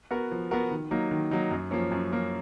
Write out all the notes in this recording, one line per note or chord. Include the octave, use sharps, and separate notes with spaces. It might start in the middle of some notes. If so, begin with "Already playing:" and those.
B3 F#4 A#4
F3
B3 F#4 A#4
D#3
F#3 A#3 D#4
D#3
F#3 A#3 D#4
F#2
F3 A#3 C#4
F#2
F3 A#3 C#4